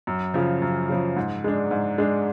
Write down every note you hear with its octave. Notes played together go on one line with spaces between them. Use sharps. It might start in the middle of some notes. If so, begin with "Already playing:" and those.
F#2
C#3 F3
F#2
C#3 F3
G#2
G#3 D4
G#2
G#3 D4